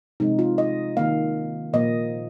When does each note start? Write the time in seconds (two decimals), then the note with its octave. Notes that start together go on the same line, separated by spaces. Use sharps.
0.20 C3 F3 G#3 D#4
0.39 F4
0.58 D#5
0.97 D#3 A#3 F5
1.73 A#2 F3 A#3 D#5